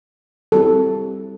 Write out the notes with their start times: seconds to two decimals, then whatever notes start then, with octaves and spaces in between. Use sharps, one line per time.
0.52 G3 C4 E4 G4 A4